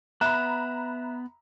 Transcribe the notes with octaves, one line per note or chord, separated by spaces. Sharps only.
B3 E5 A#5 B5 F#6 E7